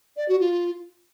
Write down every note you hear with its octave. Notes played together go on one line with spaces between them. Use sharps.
D5
F#4
F4